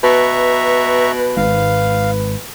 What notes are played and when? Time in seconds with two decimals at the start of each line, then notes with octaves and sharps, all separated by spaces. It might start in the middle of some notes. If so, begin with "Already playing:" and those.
0.03 B2 B4 E5 A#5 C#6
1.37 G#1 G#2 F5